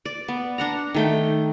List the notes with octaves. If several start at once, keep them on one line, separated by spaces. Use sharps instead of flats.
D5
B3
D4 F#5 A#5
D#3 A3 G5